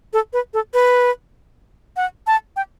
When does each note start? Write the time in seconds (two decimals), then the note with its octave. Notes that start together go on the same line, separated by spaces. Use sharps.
0.13 A4
0.33 B4
0.54 A4
0.74 B4
1.96 F#5
2.27 A5
2.56 G5